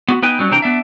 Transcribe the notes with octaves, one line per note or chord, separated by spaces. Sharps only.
B3 F#4
B3 D#4 B4 G5 G#5
F#3 G3 C#4
C3 E3 D4 C5 G5 A#5
B3 D4 E5